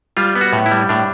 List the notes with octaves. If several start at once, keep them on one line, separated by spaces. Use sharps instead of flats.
G3 F4
B3
F#4
A2
E4
G3
A2 D4